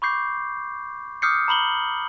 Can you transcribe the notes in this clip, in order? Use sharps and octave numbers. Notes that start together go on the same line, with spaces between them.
B5 C#6 D6 G6 C7
D6 D#6 F6 G6 C7 C#7
A#5 B5 F#7 G7